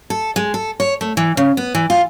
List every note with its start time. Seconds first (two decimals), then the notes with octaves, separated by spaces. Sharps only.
0.10 A4
0.36 G#3
0.54 A4
0.80 C#5
1.01 A3
1.17 E3
1.37 C#3
1.57 B3
1.75 E3
1.90 F4